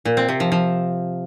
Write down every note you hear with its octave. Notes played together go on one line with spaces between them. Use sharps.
A#2
C4
C3
F3
F3